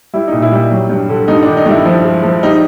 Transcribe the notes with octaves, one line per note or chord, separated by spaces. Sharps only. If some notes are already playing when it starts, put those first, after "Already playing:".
G3 E4
A#2 D#4
E4
G3
F#3
G2
D3
G2 D#4
D#3 D4
D#4
G2 E4
F3
G#3
F3
G3 D#4